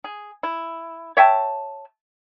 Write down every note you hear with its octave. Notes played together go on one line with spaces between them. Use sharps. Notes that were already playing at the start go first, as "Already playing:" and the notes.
G#4
E4
C#5 E5 G5 A5